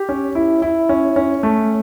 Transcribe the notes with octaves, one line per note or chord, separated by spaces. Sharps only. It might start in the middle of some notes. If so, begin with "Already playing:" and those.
Already playing: G4
C#4
E4
E4
C#4
C#4
A3